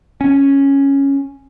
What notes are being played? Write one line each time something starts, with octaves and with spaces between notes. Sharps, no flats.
C#4